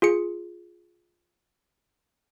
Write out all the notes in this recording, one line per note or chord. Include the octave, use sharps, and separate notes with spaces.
F4 G#4 C#7